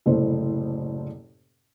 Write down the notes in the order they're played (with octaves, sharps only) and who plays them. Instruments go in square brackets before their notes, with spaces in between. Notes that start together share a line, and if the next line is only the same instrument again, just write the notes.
[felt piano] F#1 C2 A2 A4 C5